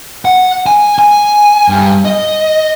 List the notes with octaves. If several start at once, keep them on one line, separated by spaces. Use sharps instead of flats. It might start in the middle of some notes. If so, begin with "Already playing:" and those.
F#5
G#5
G#5
G2
D#5